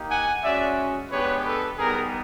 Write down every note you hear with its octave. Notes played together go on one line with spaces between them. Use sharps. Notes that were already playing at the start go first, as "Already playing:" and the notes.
Already playing: A#3 D#4 G4
F#5 G#5
G#3 C#4 F#4 D5 E5
G#3 B3 D4 G4 B4 C#5
A4 B4
G3 B3 D#4 G#4 A#4